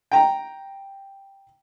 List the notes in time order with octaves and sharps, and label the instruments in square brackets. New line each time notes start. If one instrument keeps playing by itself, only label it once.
[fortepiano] G5 A#5